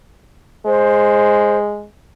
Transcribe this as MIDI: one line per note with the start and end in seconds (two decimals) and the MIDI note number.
0.66 1.86 56
0.66 1.57 72